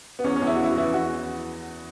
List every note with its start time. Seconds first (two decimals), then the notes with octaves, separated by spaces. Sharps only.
0.19 B3
0.24 E2 C#4
0.36 C#4
0.42 E2
0.47 E4
0.55 F#4
0.60 E3 E4
0.71 F#4
0.77 E3 E4
0.94 E2 F#4